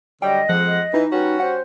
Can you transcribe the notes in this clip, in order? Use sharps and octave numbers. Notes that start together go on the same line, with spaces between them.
D3 F#3 G3 D#5 G5
F2 F3 G#3 F#5
D#5
E3 D#4
G3 C#4 F#4 B4
C5 F#5